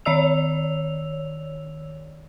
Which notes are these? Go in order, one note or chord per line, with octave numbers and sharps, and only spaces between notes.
D#3 C#5 D5 E6 F7